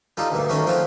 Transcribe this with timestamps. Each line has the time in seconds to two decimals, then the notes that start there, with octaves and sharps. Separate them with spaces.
0.17 G3 D#4 F4 A4
0.30 D2 G2 A#2
0.49 D#3 A3 C#4 F#4
0.66 F3 A3 C4 F4 F#4